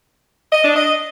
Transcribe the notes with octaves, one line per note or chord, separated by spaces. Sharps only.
D#5
D4
D#5